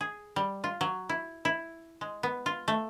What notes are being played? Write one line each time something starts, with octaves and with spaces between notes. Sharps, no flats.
G#4
G3
F4
F#3
E4
E4
G#3
B3
F4
A3